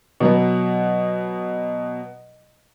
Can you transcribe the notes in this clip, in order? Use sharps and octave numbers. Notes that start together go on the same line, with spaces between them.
B2 F#3 B3